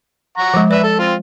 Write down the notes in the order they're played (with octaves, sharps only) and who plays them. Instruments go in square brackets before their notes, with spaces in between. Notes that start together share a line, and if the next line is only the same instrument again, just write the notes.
[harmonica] F#5 A#5 C#6
[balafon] F3 G#3
[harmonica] B4 E5 [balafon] D5
[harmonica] A4
C4 F4